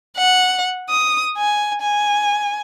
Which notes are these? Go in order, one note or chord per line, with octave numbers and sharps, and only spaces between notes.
F#5
D#6
G#5
G#5